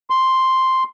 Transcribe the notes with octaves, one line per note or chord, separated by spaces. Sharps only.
C6